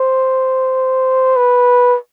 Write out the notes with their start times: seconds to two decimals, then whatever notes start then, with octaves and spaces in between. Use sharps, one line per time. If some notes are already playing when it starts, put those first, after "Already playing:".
Already playing: C5
1.36 B4